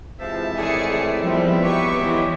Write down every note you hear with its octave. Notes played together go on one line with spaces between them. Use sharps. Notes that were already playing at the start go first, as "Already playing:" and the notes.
C3 E3 F3 G#3 E5 A5
A2 D#3 G#4 D5 C#7
F3 G3 B3 C4 E5
F#3 G4 B4 C#6
E2 B2 E3 G#3